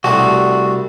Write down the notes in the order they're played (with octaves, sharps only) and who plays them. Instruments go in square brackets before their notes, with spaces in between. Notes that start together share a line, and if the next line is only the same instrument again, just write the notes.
[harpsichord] C2 G3 A3 [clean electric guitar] F#4